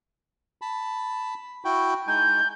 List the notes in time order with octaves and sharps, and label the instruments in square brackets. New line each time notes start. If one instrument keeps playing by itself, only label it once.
[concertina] A5 B5
E4 F#4 G5
[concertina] G#3 D#4 G#5 [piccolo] G6